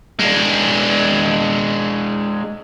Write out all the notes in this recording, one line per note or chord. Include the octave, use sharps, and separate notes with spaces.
G#3 D4